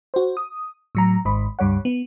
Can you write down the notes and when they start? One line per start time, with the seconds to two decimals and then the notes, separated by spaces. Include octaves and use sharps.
0.14 F#4 C5
0.37 D#6
0.95 A2 F#3 A#5
1.25 G#1 G#2 B5
1.59 C#2 G2 G3 C#5 F#5
1.85 B3